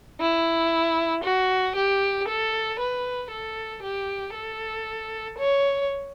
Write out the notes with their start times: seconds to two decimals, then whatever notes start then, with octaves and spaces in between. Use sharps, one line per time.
0.20 E4
1.23 F#4
1.75 G4
2.27 A4
2.79 B4
3.30 A4
3.82 G4
4.34 A4
5.38 C#5